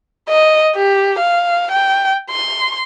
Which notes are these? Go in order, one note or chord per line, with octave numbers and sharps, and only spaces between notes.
D#5
G4
F5
G5
C6